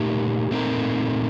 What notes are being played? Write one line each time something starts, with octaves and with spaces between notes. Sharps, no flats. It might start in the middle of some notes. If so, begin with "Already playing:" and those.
Already playing: A#2 A3 D#4 G4 A#4
A#2 A3 C4 D#4 A#4